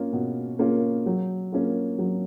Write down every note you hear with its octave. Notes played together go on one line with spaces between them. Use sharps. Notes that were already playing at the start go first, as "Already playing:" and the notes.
Already playing: A#3 C#4 F4
B2
A#3 C#4 F4
F#3
A#3 C#4 F4
F#3